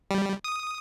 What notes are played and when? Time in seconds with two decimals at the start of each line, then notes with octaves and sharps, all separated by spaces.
0.11 G3
0.44 D#6